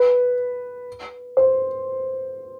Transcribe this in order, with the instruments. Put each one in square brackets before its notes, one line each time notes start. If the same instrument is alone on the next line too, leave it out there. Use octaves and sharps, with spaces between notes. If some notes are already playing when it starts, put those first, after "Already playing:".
Already playing: [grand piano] B4
C5